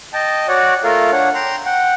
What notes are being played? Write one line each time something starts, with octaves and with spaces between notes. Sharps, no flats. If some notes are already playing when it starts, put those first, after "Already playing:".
D#5 G5 A5
F#4 C#5 D5 F#5
A3 F4 A4 A#4 F5
D4 C#5 F#5
G5 A#5 C6
F#5 G5